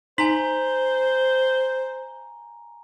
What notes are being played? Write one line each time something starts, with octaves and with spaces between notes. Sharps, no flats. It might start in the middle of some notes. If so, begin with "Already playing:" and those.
D#4 C5 G#5 A#5 F#7